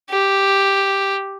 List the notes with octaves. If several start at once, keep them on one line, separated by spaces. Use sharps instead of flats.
G4